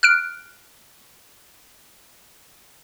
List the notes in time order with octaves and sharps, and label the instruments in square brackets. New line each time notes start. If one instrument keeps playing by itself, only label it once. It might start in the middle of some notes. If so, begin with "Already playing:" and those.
[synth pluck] F6 F#6 D7